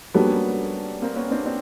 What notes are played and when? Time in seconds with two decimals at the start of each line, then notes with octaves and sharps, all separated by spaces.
0.14 G3 A#3 B3 C#4 D4 F#4 A4
1.02 A#3 C4
1.16 B3 C#4
1.31 C4 D4
1.46 C4 D4